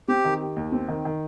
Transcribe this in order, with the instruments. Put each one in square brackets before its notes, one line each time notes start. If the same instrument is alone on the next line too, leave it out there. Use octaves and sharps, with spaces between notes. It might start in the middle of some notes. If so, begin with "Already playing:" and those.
[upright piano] C4 [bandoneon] G4
[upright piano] D#3
G4
D#2
C4
D#3
D#3